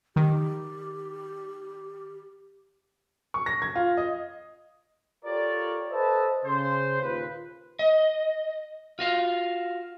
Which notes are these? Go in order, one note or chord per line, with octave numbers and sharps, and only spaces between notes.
D#3 G4
C#6
A#6
G#6
F4
D#5
F4 G4 A4 A#4 C#5 D5
A4 B4 C5 D#5 E5 A5
C#3 C5
D#2 A#2 F4 B4
D#5
F4 F#4 F5